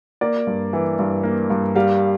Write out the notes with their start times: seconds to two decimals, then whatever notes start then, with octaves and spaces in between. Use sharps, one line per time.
0.21 A#3 D5
0.47 G2
0.73 E3
0.99 G2
1.23 A#3
1.50 G2
1.75 G3 F5